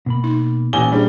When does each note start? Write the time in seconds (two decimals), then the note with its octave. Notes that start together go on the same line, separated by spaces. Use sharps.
0.06 B2 A#3 B5
0.24 D#4
0.73 A1 A#2 G#5 G7
0.92 G3 D4 G#4 C5